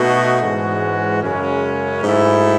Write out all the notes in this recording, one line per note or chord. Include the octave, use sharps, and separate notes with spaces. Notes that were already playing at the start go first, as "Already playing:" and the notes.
Already playing: B2 A3 D#4 F#4
G#2 E3 G#3 C#4 F#4
F#2 C#3 G#3 C#4
G#2 F#3 A3 E4